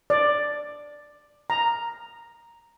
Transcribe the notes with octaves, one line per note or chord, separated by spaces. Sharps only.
D5
A#5